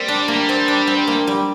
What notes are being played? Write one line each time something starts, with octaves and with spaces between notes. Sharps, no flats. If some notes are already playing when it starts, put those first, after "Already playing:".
Already playing: G3 A#3 C4
D4
A#3
C4
D4
C4
A#3
G3